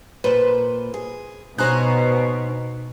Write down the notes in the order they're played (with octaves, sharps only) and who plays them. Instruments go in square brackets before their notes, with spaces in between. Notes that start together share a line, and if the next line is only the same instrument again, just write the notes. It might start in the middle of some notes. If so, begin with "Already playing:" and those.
[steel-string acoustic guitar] A#2 [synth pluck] B4 C5
[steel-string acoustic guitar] G#4
[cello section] B2 [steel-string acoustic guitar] D#4 C5 C#5 [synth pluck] G#5 A#5 F#6